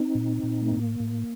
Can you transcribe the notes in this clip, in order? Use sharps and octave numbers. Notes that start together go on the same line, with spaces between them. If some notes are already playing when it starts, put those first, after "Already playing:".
Already playing: C4 D#4
A#2
A#2
A3
A2 A#3
A2